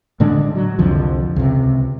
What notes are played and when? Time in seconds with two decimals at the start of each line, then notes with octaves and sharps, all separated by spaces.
0.20 A2 D3 G#3 D4
0.55 F#3
0.79 C2 F2 D3 F3
1.36 C#2 C3